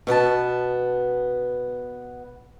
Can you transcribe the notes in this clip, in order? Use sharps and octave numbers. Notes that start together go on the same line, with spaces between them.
B2 B3 D5 A5